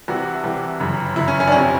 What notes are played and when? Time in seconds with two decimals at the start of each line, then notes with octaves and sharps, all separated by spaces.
0.08 C2 C3 E3 F#4
0.44 C2 C3 E3
0.80 G1 F#2 C#3
1.16 G1 F#2 C#3 E4
1.28 C#4
1.40 C#4
1.48 D4
1.52 F#1 F2 C3 C#4